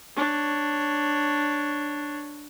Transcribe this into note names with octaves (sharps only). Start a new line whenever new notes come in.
D4 C#5